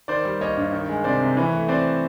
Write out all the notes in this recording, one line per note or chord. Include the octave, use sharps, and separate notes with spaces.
D#3 C5 D5
G3
A#3 C#5 D#5
G2
D#3
G#3
C3 C5 D5
C3
E3 B4 C#5
A3
C4 C5 D5